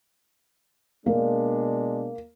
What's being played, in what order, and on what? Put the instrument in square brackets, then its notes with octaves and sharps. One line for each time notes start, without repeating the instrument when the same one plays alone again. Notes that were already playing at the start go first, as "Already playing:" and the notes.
[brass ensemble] B2 G#3 D4 [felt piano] A#3